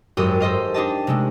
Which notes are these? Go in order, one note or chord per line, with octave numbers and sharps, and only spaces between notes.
G#1 F#2 G4 A4 D#6 G6
A4 C5 D#5 F5
D4 D#4 G4 D#5 A5
C3 G#3 A3